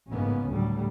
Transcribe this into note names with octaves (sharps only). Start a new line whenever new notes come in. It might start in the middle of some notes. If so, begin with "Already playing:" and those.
A1 G#2 C#3 A#3 B3 C#4
D2 A2 F#3 G3